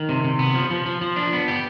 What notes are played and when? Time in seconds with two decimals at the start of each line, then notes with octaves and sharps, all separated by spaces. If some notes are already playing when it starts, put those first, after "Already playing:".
Already playing: D#3
0.09 C3
0.24 C3
0.39 B3
0.55 F3
0.71 F3
0.86 F3
1.01 F3
1.16 D4
1.33 B3
1.48 G4